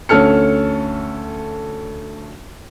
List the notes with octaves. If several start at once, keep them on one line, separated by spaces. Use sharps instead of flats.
D2 C#4 A4 F6 C#7